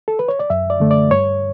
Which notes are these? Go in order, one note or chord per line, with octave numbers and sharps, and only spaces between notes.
A4
B4
C#5
D5
F#2 E5
D5
D3 A3
D5
G2 C#5